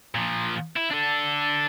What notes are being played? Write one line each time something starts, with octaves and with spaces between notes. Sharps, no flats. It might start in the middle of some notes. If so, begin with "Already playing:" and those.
A#2 F3
E4
D4 A4